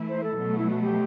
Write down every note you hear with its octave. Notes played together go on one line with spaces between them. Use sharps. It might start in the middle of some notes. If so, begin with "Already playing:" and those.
Already playing: E3 A3 E4
C5
A4
B2 F#3 A3
E4
F#4
G4